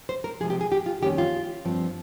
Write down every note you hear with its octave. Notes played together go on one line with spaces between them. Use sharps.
C5
A#4
C3 F3 G#3 G#4
G4
G#4
G4
F4
F2 D#3 G3 A#3 C#4 G4
F4
G2 F3 C4